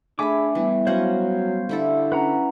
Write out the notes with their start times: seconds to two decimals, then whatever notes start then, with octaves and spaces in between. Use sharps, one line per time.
0.19 A3 D4 G#4 E5 G#5 B5 D6
0.55 E3 G3 B3
0.87 F#3 C#4 C5 C#5 D#5 F5 F#5
1.69 D3 G3 E4 A4
2.12 C#4 B4 F#5 A#5